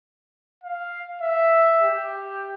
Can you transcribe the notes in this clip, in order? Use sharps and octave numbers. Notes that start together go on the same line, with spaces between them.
F5
E5
G4